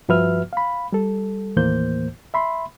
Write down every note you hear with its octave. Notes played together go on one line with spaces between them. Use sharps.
G2 F3 F#4 B4 E5 F6
F5 B5
G3 A4
D#2 A2 E3 A#3 C5 G6
E5 B5 C6